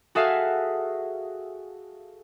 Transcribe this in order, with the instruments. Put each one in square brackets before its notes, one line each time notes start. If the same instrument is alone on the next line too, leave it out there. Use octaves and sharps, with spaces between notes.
[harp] F#4 G#4 A4 E5 F5